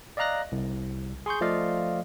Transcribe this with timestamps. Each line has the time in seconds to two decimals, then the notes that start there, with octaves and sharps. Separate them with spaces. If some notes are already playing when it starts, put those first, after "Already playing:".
0.17 D5 D#5 F5 A#5 F#6 A#6
0.52 C2
1.26 G#4 C6 C#6 G6
1.41 F3 A3 F4 D5 D#5 F5